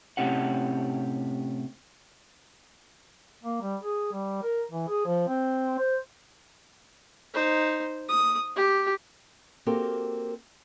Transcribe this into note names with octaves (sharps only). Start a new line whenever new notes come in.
A2 C3 C#4 G4 F#5
A#3
G3
G#4
G3
A#4
E3
G#4
F3
C4
C5
D#4 C5
D#6
G4
A#3 C4 F#4 G4 A4 A#4